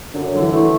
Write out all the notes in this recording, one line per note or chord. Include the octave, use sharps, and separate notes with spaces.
F#2 D3
D3 F#3
E3
E3 A3